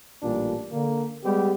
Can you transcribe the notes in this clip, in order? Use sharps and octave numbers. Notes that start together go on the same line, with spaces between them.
A1 A#2 G3 D4
D3 A#3
G3 G#3 B3 G4